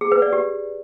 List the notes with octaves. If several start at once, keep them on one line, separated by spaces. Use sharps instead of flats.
G#4
B4
D5
G4